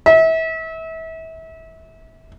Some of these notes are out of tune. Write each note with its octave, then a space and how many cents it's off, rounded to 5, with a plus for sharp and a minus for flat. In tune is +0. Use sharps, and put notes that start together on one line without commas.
E5 -30